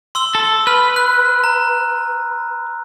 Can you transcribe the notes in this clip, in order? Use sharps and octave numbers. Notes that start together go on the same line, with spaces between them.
C6 E6 G7
A4
B4 F6
F#6
A#5